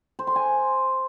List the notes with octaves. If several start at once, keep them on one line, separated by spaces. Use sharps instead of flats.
C5
C6
G#5